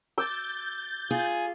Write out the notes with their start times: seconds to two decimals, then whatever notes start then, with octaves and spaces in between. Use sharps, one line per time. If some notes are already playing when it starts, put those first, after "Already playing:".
0.18 D6 E6 G6 A6
1.11 F4 G#4